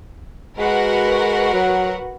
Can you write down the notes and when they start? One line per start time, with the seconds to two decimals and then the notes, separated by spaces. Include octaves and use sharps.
0.59 G#3 F#4 A#4 B4 F#5
1.53 F#3